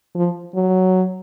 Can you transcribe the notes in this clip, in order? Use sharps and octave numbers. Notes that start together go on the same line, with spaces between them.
F3
F#3